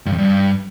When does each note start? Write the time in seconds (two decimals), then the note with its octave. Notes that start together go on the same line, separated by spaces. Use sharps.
0.06 G2
0.12 F2
0.18 G2